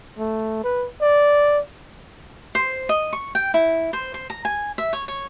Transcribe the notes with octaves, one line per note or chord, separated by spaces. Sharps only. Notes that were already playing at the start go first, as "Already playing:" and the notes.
A3
B4
D5
C5
D#5
C#6
G5
E4
C5
C5
A#5
G#5
E5
C#5
C#5